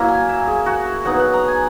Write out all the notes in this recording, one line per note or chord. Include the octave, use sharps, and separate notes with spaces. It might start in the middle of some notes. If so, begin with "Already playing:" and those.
Already playing: F#3 A#3 E4 A#5
G#5
E5
G#4
F#4
E5
F#3 B3 D#4 F#5
F#5
A#5
G#5